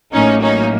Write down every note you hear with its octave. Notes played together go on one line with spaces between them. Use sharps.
A1 A2 F#3 A#3 C#4 D#4
C#4 D#4